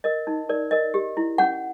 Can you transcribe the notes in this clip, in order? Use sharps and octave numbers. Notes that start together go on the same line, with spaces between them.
A#4 D#5
D#4
A#4 D5
A#4 D#5
G4
E4
C#4 F#5